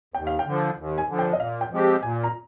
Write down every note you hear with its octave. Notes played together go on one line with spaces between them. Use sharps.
D#2 G5
F5
G5
D3 F3
D#2
G#5
D3 F3
G5
D#5
A#2 F5
G5
F3 G#3 C4 G4
A#2 G#5
A#5